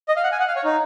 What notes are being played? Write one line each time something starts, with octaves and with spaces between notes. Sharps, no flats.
D#5
F5
F#5
G#5
F#5
F5
C#5
D#4